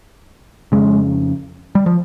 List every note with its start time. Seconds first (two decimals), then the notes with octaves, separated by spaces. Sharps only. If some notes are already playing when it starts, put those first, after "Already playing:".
0.72 F2 C#3 G#3
1.75 G3
1.86 F3